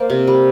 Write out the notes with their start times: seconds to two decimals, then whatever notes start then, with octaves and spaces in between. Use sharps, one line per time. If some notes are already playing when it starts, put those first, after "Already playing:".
Already playing: A#3 C5 D5
0.10 C3
0.27 G3